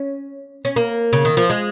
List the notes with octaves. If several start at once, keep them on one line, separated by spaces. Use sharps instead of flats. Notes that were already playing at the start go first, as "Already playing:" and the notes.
Already playing: C#4
C#4
A#3
C#3
D#3
F3
G#3